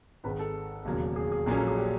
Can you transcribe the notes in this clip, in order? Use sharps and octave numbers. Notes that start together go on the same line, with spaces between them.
G#1 G#2 D#3 B4
A4
E1 D#2 C#3 F#3 A#3
G#4
G#4
A#1 A#2 F#3 A#3 C#4 G#4
A4
G#4
G4